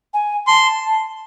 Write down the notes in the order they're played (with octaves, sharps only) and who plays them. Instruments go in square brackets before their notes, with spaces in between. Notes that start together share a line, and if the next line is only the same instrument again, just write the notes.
[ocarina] G#5
[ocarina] A5 [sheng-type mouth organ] C6